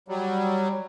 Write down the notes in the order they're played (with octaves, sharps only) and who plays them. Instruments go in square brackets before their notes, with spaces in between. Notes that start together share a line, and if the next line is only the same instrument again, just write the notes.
[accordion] F#3 G3